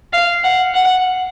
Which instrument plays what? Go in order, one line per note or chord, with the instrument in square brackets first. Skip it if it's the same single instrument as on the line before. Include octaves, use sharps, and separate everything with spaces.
[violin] F5
F#5
F#5